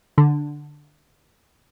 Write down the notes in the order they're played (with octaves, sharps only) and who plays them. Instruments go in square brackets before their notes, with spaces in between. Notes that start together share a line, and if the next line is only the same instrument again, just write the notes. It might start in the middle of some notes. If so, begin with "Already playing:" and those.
[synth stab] D3